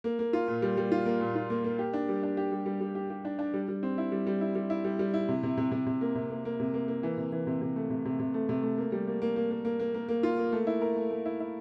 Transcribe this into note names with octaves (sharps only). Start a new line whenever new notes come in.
A#3
A#3
F4
A#2
G3
G3
F4
A#3
A#2
F4
A#3
A#3
G4
D4
G3
D4
G4
G3
G3
G3
G4
G4
D4
D4
G3
G3
C4
E4
G3
G3
E4
G3
E4
G3
G3
E4
C3
C3
C3
C3
C3
A#3
C3
A#3
A#3
C3
A#3
A#3
E3
C3
E3
C3
C3
A3
C3
C3
C3
A3
C3
A3
A#3
G3
A#3
A#3
A#3
A#3
A#3
A#3
A#3
A#3
F4
A#3
A3
E4
A#4
A3
A3
E4
E4